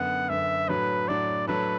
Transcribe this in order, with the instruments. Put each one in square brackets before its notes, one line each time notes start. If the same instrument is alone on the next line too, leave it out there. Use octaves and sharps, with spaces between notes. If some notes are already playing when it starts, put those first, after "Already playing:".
Already playing: [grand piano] F#2 D3 B3 [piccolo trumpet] F#5
[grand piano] F#2 D3 B3 [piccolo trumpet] E5
[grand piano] A2 F#3 D4 F#4 [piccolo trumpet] B4
[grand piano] A2 F#3 D4 F#4 [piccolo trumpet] D5
[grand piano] A2 F#3 D4 A4 [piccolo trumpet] B4